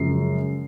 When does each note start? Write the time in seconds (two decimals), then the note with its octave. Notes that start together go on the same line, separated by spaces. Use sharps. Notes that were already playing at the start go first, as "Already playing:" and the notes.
Already playing: F#2 C#3 F3 G#3 C7